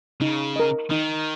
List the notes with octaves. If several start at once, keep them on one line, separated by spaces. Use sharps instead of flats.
C#3 D#4
A#4 D#5
D#3 D#4